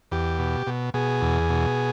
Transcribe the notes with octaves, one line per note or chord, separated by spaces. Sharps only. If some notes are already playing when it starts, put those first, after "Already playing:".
E2 G4
B2
B2
B2 G#4
E2
B2